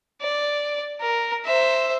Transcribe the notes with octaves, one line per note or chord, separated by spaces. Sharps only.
D5
A#4
C5 E5